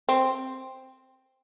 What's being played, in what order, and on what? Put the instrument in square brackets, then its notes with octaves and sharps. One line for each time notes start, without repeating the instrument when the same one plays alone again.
[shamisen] C4